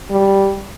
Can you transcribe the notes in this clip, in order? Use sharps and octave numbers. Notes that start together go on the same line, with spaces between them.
G3